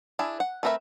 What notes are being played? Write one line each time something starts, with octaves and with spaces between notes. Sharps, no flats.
D4 E4 G#4
F#5
A3 C4 A#4 B4 E5